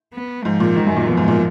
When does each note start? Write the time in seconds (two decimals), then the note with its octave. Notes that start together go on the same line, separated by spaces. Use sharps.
0.14 B3
0.44 G#2 F3
0.60 A#2
0.76 G#2 D#3
0.87 F#2
0.97 A#2
1.07 B2 F3
1.17 G#2
1.28 A#2